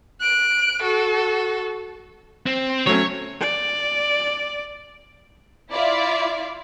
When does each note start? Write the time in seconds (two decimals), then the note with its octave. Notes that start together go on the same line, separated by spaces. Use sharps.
0.21 F#6 D7
0.83 F#4 A4
2.46 C4
2.87 F#3 A3 C#4 C#5
3.41 D5
5.72 E4 F4 D5 E5 F5